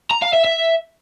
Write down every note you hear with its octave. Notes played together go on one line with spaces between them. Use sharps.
A#5
F5
E5
E5